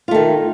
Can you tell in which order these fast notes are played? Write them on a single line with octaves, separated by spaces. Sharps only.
F4 A3 D#3